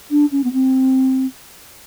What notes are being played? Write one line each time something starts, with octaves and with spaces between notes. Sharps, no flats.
D4
C#4
B3
C4